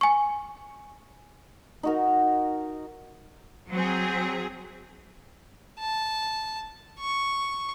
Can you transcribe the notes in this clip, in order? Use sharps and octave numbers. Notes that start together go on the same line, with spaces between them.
G#5 C#6
D#4 F#4 A#4
F#3 C4 G#4
A5
C#6